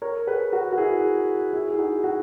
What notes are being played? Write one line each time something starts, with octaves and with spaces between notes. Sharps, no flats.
A#4 C#5
G#4 B4
F#4 A#4
F#4
E4 G#4
E4 G#4
G#4
D#4 F#4
D#4 F#4